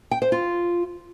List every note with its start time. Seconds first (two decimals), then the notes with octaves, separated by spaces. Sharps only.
0.11 G5
0.22 C5
0.32 F4